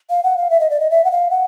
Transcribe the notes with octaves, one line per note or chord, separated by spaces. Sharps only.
F5
F#5
F5
E5
D#5
D5
D#5
E5
F#5
F5
F#5